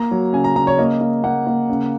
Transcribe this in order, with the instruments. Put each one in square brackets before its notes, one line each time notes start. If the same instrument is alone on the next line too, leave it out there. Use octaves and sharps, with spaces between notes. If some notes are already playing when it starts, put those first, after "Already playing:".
Already playing: [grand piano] A#3 A#5
F#3
C#3 G#5
A#5
C#3 A#5
C#5
A#3 D#5
A#3
A#3 F#5
A#3
C#3